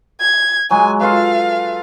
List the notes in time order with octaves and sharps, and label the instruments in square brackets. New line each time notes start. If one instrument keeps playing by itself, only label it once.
[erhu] G#6
[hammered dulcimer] F#3 G#3 [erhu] G#5
[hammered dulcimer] F4 A4 B4 [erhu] F5